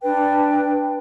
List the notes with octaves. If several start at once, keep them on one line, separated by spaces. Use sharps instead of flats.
D4 B4 G5